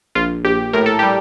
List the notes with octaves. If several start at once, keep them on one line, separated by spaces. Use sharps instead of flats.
A#1 F4
A#1 G4
A2 A#4
A4
G3 G4